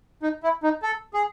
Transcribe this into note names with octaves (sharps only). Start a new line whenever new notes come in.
D#4
E4
D#4
A4
G#4